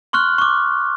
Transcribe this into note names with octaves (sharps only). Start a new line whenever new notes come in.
C6 C#6 F6 F#6
C#6 D6